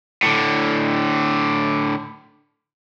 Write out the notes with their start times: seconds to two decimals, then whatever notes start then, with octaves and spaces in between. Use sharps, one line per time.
0.23 A2 D3